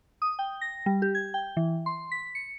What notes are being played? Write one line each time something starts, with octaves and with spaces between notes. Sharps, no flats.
D#6
G5
A#6
G3
G4
G#6
G5
E3
C6
B6
C#7